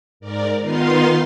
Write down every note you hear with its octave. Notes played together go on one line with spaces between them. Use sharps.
G#2 A#4 D5
D#3 B3 D#4 F4 F5 C6